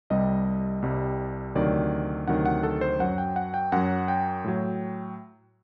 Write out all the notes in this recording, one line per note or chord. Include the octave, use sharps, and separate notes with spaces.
C2 C3 G3 D#5
C2 C3 G3
D2 C3 D#3 F#3 D5
D2 C3 D#3 F#3 F#5
F#5
A4
C5
F#2 F#3 F#5
G5
F#5
G5
F#2 F#3 F#5
G5
A2 F#3